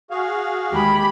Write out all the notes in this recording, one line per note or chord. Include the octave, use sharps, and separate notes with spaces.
F#4 G#4 F5
D#2 G#3 G4 B5